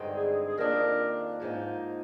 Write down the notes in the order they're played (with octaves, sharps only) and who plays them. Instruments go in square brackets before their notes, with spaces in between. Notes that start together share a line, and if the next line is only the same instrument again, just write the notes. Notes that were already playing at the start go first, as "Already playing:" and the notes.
Already playing: [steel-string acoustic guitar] G2 D3 G#3 C4 D#4
[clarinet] G#4
G#4
[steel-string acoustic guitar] F2 D#3 A#3 D4 [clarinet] A#4
[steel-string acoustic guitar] G#2 F3 A#3 D#4